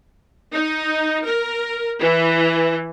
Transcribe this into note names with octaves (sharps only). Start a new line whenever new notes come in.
D#4
A#4
E3